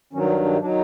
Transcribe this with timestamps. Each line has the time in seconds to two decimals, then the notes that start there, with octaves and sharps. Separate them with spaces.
0.13 G2 D#3 F#3 C#4
0.29 D4
0.45 D4
0.60 D#3 F#3 D4